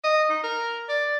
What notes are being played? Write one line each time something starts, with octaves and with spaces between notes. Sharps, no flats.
D#5
D#4
A#4
D5